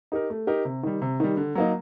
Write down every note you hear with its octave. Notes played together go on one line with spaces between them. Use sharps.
D#4 G4 A#4
A3
D#4 G4 A#4
C3
D#3 G3
C3
D#3 G3
D3
F#3 A#3 D#4